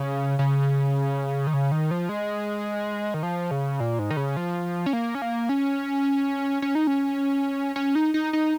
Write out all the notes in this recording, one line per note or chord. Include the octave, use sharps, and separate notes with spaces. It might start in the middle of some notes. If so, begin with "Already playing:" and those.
Already playing: C#3
C#3
D#3
C#3
D#3
F3
G#3
D#3
F3
C#3
A#2
G#2
D#3
C#3
F3
C#4
A#3
C#4
A#3
C#4
C#4
D#4
C#4
C#4
D#4
D#4
D#4